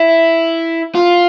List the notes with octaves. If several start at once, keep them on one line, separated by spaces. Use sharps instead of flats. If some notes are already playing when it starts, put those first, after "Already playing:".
Already playing: E4
F4